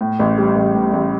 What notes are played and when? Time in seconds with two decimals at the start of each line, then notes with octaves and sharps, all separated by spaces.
0.01 A2
0.19 A1
0.38 G3
0.56 A1
0.75 A2
0.93 A1